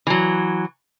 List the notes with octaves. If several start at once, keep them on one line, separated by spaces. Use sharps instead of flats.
E3 F#3